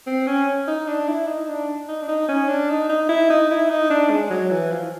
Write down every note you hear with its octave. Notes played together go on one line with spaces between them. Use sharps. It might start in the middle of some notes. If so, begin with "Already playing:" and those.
C4
C#4
D#4
D4
E4
D#4
D4
D#4
D4
D#4
C#4
D4
D#4
D#4
E4
D#4
E4
D#4
D4
G#3
F#3
E3
F3